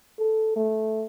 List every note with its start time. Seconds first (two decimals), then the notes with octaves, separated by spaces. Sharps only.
0.19 A4
0.56 A3